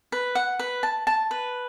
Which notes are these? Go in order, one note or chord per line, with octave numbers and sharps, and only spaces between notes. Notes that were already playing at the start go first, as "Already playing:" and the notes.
B4
F#5
B4
A5
A5
B4